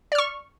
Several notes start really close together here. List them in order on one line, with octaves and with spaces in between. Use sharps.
D5 F6 C#6